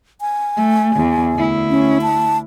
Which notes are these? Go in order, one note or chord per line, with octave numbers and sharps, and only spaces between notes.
G#5
A3
E2
D2 E4
C#4
A5